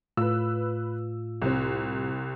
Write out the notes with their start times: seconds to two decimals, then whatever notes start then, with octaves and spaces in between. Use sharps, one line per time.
0.17 A2 F4 B4 E6
1.42 C2 C4